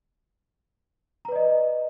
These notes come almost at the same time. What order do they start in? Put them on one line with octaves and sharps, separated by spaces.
A#5 B4 D5 D#5